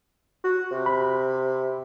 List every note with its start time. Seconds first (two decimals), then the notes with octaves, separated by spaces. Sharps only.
0.44 F#4
0.71 C3
0.86 B5